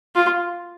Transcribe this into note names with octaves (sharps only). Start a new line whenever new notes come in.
F4